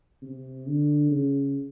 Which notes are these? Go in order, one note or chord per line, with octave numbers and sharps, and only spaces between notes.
C3
D3
C#3